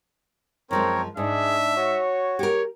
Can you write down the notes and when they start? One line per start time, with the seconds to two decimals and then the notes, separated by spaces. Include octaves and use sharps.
0.71 F#2 F3 G#3 C4 A#4 C#5
1.17 G#2 D4 G#4 E5
1.77 F#4 C#5
2.39 G4 A#4 C#5